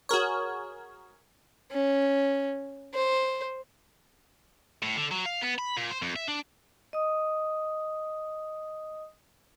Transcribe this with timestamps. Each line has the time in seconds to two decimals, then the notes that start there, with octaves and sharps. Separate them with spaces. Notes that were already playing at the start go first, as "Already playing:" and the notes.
0.09 F#4 G#4 A#4 C#5
1.72 C#4
2.95 C5
4.82 A2
4.96 D3
5.11 F#3
5.25 F5
5.41 B3
5.58 B5
5.77 A#2
5.91 C5
6.02 F2
6.16 E5
6.28 D4
6.93 D#5 D#6